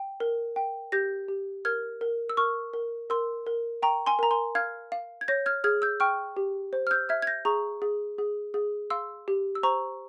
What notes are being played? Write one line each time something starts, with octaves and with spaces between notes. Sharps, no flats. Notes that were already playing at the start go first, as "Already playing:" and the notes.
Already playing: G5
A#4
G5
G4 G6 A#6
G4
A#4 F6 G#6
A#4
E6
A#4 C#6 F6
A#4
A#4 C6 E6
A#4
G5 A#5 C#6
G#5 C6
A#4 A#5
G#5 C6
F5 F6 G#6
F5
G#6
C#5 G6 A#6
F6 G#6
G#4 F6 G#6
E6 G6
G5 C#6 F6
G4
C5
F6
E6 G6
E5 F6 G#6
G#6
G6 A#6
G#4 A#5 C#6
G#4
G#4
G#4
F5 C6 E6
G4
E6
C5 A#5 C#6